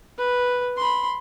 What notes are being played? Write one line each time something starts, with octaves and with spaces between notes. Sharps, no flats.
B4
B5 C6